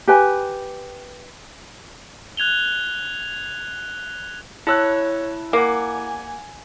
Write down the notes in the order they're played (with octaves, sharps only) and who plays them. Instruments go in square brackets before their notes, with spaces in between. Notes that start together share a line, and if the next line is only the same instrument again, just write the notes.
[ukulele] G4 B4 G#5
[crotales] F#6 G#6 F7 G7
[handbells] E4 [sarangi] C#5 [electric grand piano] A5 E6 F#6
[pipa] A#3 [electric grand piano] F#5 D6 [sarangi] G#5